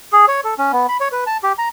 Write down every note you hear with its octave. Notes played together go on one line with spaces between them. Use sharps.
G#4
C#5
A4
C#4
B3
B5
C#5
B4
A5
G4
A#5